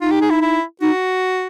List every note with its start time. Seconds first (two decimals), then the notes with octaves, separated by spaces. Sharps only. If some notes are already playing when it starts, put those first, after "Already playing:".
0.01 D#4 F4
0.11 G4
0.22 G#4
0.31 E4
0.42 E4
0.81 D#4 F#4